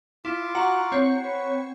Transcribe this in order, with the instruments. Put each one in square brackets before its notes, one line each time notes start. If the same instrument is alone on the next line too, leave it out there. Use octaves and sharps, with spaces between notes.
[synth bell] E4 [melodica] F4 C6 D6
[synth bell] F#4 A#5 C#7 [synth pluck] F#5 C#6
[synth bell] C4 C#5 C#7
[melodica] B4